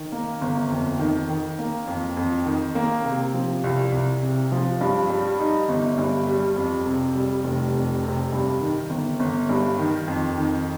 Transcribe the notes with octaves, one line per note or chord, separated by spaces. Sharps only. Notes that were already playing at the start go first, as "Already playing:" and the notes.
Already playing: D#3
A#3
G1
F2
D#3
D#3
A#3
F2
F2
D#3
A#3
C3
F3
C2
C2
C3
F3
G2
G3
D#4
G1
G2
G3
F2
C3
G3
F1
F2
C3
G2
D#3
G1
G1
G2
D#3
F2
D#3